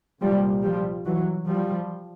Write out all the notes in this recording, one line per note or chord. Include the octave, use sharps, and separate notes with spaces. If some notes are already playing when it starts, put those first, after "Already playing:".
C2 A#2 F3 G3
F3 G3
E3 F#3
F3 G3